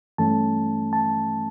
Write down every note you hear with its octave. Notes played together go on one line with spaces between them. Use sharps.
G2 E3 A3 C#4 A5
A5